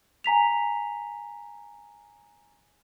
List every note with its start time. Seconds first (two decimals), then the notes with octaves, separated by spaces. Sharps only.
0.24 G#5 A#5 B6 F7